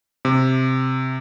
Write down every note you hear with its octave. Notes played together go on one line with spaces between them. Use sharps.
C3